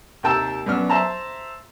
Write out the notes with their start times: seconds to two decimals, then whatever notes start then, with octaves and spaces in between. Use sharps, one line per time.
0.23 D#2 C3 A#4 G5 A5 E6
0.66 F#2 B3 D4 F6
0.90 C5 E5 A5 A#5